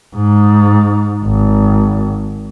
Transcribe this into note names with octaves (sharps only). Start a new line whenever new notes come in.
G#2
G#1